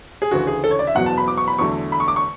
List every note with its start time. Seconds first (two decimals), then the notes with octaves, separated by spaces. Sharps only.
0.22 G#4
0.31 D2 C#3 E3 F#4
0.47 G#4
0.64 A4
0.71 C#5
0.79 D5
0.87 E5
0.95 F#1 E2 B2 F#3 B3 F#5
1.06 A5
1.18 B5
1.28 D6
1.37 C#6
1.48 B5
1.58 E2 D3 F#3 A3 C#6
1.92 B5
2.00 C#6
2.08 D6
2.16 C#6